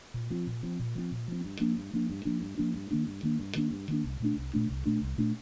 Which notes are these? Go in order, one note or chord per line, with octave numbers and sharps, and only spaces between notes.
A#2
F3 C4
A#2
F3 C4
A#2
F3 C4
A#2
F3 C4
G2
F3 A#3 D4
G2
F3 A#3 D4
G2
F3 A#3 D4
G2
F3 A#3 D4
G2
D#3 A#3 D4
G2
D#3 A#3 D4
G2
D#3 A#3 D4
G2
D#3 A#3 D4
C2
A#2 A3 D4
C2
A#2 A3 D4
C2
A#2 A3 D4
C2
A#2 A3 D4